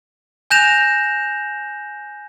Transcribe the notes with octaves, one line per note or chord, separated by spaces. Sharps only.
G#5 F#6 G6 A#6 E7 F7